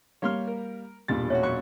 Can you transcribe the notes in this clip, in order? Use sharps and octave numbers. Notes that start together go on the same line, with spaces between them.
G3 A#3 C#5 C6 F6
A#4
E1 G2 A#2 A6
A3 C#4 F#4 C#5
F#2 C#6 F#6